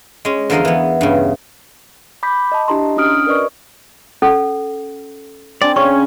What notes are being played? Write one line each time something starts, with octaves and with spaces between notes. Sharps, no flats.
G#3 C#4
E2 D3 F3 A#4 D#5 F5
E3 B3
G2 C#3
B5 D6 G6 B6
D#5 A5
D4 E4 G4 D#5 A#5 C6
C#4 D4 F#4 D#6 F6 D7
A#4 B4 D5 D#5 C#6
C#4 A4
C4 D4 D5 G#5
C#3 C#4 C#6